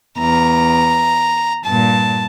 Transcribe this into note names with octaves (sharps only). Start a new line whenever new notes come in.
E2 A#5
G2 A#2 A5